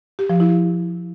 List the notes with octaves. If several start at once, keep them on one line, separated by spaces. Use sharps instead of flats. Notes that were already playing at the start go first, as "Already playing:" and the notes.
G4
F3
E4